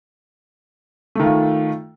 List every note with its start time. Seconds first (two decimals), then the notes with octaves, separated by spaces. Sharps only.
1.15 A3
1.20 D#3
1.24 F4